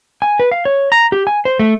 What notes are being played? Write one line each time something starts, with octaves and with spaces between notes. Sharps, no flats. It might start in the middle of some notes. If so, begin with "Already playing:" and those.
G#5
B4
F5
C#5
A#5
G4
G#5
C5
A3